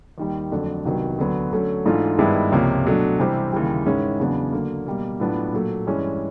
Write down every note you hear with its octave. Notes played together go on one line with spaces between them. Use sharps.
D#2 D#3 G3
F2 D3 F#3 A3 D4
C2 C3 D#3 F#3 B3
D2 D3 F#3 B3
D3 F#3 A3 C#4
G#2 E3 A3 D4 F4
G2 D#3 G#3 B3 E4
C#2 C3 F3 A#3 C#4
B2 F#3 A3 D4
C3 E3 G3 C4
D#2 C#3 E3 G3
G#2 D#3 G#3 C#4 E4
E2 C#3 F#3 B3 D4
D3 F#3 A#3
B2 G3 A#3
A2 F#3 B3 D4 F4
A#2 F#3 A3
G2 E3 G#3 C#4